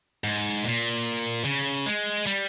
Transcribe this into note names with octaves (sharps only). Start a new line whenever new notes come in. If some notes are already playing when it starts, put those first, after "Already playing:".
G#2
A#2
C#3
G#3
G3